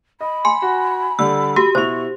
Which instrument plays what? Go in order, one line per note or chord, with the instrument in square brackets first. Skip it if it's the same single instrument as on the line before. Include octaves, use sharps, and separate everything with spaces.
[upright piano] D#5 [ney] B5
[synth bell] G#5 [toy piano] C6
[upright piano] F#4
[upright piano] D3 G3 [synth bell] E6
[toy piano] F#4 [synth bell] G4
[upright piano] B2 E4 F7 [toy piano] C5 [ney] C#6